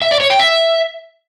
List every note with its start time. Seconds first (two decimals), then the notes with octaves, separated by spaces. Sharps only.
0.02 E5
0.11 D5
0.21 C#5
0.30 G5
0.40 E5